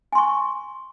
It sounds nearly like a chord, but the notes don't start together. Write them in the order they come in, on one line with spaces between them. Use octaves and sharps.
G#5 C6 C#6